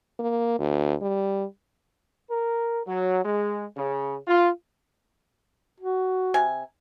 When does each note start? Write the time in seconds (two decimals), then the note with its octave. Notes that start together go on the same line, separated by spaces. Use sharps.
0.20 A#3
0.59 D2
1.02 G3
2.30 A#4
2.86 F#3
3.23 G#3
3.77 C#3
4.27 F4
5.80 F#4
6.34 C3 G#5